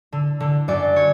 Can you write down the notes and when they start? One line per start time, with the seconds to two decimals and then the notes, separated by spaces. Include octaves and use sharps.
0.12 D3
0.40 D3
0.68 F#2 D5
0.96 C#5